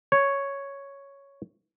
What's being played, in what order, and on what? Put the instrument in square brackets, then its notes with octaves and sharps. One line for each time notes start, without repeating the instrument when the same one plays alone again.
[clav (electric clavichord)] C#5